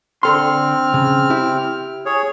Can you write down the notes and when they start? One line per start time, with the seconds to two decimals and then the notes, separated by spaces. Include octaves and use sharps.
0.23 D3 C4 A4 C6 F6
0.94 C#3
1.30 E4 G4
2.06 G#4 C#5